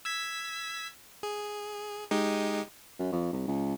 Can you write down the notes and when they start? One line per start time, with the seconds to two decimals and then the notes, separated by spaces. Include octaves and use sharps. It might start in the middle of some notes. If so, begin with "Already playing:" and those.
0.05 E6 G#6 B6
1.23 G#4
2.11 G#3 D#4 G4
2.99 F#2
3.12 F2
3.33 C2
3.47 C#2